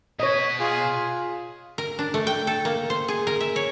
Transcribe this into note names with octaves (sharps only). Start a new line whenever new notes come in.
B2 B4 C#5 D#5
F4 G#4
A#4
D4
A3
G5
A4
A#3
C5
G#4
A#4
E5
C#5